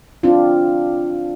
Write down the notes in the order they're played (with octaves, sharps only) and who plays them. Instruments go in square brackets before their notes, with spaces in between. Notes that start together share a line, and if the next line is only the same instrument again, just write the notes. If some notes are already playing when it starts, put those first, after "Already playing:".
[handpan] C4 D4 F4